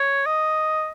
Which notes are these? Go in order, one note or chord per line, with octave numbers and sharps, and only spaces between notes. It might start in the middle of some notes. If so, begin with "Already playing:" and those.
Already playing: C#5
D#5